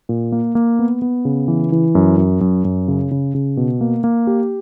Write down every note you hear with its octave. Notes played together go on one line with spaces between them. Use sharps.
A#2
A#3
A#3
B3
B3
C#3
E3
E3
F#2
F#2
F#2
F#2
C#3
C#3
C#3
B2
A#3
A#3
G4